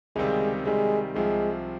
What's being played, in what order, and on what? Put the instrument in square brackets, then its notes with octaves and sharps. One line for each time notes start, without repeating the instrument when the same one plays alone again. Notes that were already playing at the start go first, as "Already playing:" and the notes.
[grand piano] C#2 C3 D#3 G3 C4 [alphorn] G#3
[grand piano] C3 D#3 G3 [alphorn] G#3
[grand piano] C2 C3 F3 [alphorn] G#3